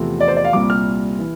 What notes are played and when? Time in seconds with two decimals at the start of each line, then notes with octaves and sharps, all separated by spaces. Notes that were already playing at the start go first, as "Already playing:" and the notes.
Already playing: E2 C3 F3 A3 C4
0.20 D5
0.28 C5
0.37 D5
0.45 F5
0.53 C2 A#2 G3 C4 D6
0.70 F6
1.19 E3